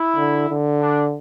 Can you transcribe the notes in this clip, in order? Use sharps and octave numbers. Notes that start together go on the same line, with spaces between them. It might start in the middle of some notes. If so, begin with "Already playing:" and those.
Already playing: E4
D3
D3
D4